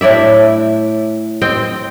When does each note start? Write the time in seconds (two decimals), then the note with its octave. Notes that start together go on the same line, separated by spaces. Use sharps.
0.01 A2 E4 D5 E5
1.42 C4 D#5 G5